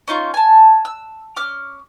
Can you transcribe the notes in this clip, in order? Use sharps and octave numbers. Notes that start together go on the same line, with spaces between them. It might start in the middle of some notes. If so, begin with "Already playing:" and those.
C#4 D#4 F4 C#6
G#5 A5
E6
C#4 D6 F6